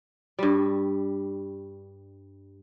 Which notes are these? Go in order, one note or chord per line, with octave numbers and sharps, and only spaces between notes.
G2 G3